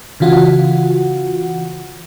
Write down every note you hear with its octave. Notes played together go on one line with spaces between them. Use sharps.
C#3 E3 F4 F#4 F#5